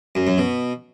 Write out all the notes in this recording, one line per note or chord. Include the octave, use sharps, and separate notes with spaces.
F#2
F#2
B2